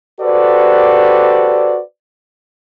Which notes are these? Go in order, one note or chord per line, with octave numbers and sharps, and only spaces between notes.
F#4 G4 A4 B4 C5 D5